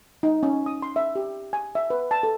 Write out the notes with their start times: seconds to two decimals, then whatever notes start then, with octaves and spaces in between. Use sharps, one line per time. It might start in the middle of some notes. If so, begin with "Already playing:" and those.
0.23 D#4
0.43 C#4
0.66 D#6
0.82 C6
0.96 E5
1.16 G4
1.53 G#5
1.75 E5
1.90 B4
2.11 A5
2.23 A4